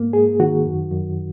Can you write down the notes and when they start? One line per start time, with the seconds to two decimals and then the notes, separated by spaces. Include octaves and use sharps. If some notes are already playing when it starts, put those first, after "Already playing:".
Already playing: G#2 A#3
0.13 G#2 G#4
0.40 D#3 F#4
0.65 F#2
0.91 F#2